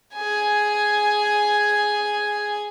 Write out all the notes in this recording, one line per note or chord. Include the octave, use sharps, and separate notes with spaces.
G#4 G#5